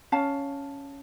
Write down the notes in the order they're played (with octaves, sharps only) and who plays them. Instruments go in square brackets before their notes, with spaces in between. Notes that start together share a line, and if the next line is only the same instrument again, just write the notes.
[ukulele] C#4 F5 A5